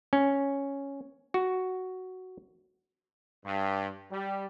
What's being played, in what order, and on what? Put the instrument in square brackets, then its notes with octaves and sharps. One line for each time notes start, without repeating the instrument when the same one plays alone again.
[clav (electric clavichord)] C#4
F#4
[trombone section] G2
G3